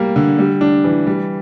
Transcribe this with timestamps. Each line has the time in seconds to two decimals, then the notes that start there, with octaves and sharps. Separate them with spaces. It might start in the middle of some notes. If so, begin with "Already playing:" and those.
Already playing: G3 A#3
0.16 D3
0.39 G3
0.61 D4
0.84 E3
1.07 G3